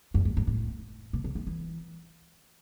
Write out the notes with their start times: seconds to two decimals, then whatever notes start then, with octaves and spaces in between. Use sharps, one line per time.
0.14 F#2
0.25 G2
0.37 G2
0.47 A2
1.13 B2
1.24 C3
1.35 D#3
1.47 E3